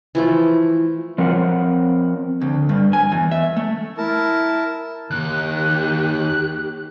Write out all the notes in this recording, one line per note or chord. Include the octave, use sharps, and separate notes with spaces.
E3 F3 A3
F3 C4 A#4 F#5
D2
G2
G#5
E2
E5
A3
E4 A#4 A5
D#2 D#3 G4 F#6